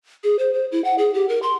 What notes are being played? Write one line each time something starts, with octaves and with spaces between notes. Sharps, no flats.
G#4
C5
C5
E4
F#5
G#4
G4
A#4
C6